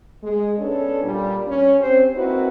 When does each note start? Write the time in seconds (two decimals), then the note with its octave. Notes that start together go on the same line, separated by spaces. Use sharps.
0.23 G#3
0.57 B3 C#4 D4 A4
1.03 A#2 G3
1.47 C#4
1.79 C4 C#4 G4 C5
2.14 A#3 C4 D#4 E4 F#4 B4